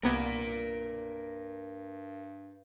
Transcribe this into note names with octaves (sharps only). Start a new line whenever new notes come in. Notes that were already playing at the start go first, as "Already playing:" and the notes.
C2 G2 A#3 B3 A#4 D5 G#6